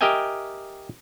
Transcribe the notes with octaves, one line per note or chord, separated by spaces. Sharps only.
G4 A#4 D#5 E5 G5 G#5